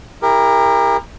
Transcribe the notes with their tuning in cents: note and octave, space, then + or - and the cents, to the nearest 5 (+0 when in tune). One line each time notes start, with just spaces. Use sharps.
E4 +0 G4 +40 A#4 +0